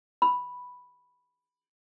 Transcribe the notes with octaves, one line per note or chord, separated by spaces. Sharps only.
B5